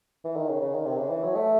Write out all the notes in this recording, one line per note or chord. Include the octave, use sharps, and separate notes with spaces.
E3
D#3
C#3
C#3
D#3
C3
C#3
E3
F#3
A3